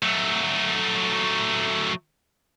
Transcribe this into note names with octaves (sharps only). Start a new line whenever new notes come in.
F#3 A3